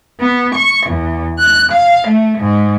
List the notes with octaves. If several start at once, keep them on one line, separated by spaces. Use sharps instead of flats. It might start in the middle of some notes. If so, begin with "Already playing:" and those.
B3
C#6
E2
F#6
F5
A3
G#2